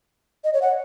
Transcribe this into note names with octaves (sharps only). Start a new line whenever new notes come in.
D#5
C#5
F#5